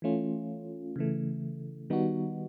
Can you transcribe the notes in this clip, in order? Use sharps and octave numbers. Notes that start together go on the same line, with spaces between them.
E3 A3 C#4 F4
C#3 E3 A3
D#3 G3 B3 D#4 F#4